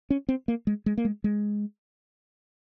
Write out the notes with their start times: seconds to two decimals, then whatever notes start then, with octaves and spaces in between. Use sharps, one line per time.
0.10 C#4
0.29 C4
0.48 A#3
0.67 G#3
0.86 G#3
0.97 A#3
1.05 G#3
1.24 G#3